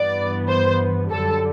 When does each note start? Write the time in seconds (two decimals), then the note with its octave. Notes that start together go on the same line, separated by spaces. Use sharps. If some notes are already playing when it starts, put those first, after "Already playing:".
Already playing: G2 E3 B3 D5
0.48 C5
1.11 F#2 D3 G3 A4